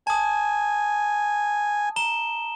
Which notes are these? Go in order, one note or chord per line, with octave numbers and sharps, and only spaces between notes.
G#5 A5 D#6
A#5 E7 G7